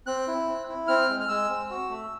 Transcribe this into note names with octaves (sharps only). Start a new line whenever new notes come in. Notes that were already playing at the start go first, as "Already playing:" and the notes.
C4 F#6
E4
C4
E4
C4 F6
G#3
F6
G#3 E6
C4
F#4
A3